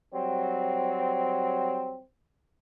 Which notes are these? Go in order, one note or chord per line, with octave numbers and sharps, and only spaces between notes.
F#3 G3 C4